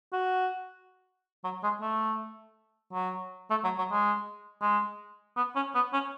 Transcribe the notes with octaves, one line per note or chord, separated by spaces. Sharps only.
F#4
F#3
G#3
A3
F#3
A3
F#3
F#3
G#3
G#3
B3
C#4
B3
C#4